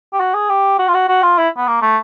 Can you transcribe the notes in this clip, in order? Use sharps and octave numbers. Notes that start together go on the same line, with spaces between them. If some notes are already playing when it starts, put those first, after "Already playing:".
G4
F#4
G#4
G4
F#4
F4
F#4
F#4
F4
E4
B3
A#3
A3